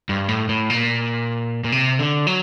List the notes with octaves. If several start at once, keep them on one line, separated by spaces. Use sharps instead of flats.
G2
A2
A2
A#2
A#2
C3
D3
F#3